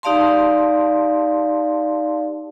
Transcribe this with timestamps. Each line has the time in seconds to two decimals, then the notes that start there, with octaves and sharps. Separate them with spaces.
0.03 D#4 G4 D5 F5 A5 C6